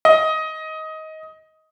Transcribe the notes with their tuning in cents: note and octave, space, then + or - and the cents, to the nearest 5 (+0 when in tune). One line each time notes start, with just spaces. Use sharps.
D#5 +20